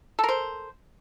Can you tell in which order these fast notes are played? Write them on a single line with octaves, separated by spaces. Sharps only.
A4 A#4 C5